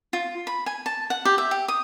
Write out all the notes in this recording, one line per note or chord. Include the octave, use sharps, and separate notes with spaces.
F4
B5
G#5
A5
F#5
G4
E5
G4
D#6